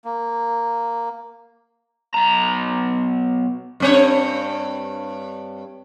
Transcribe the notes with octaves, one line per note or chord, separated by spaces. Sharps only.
A#3
B1 A#5
G2 C4 C#5